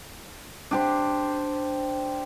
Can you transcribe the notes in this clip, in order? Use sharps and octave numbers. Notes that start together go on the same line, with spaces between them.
D4 G4 C5